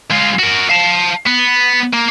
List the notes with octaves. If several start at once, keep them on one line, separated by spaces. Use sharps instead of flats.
G#3 F4
F#4 A#4
F5 A5
B3
A#3